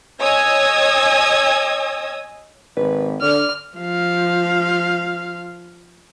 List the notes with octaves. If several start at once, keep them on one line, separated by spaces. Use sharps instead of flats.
C#5 D#5 G#5 D#6 E6 G#6
G#1 B4
D3 D5 F6
F3 F5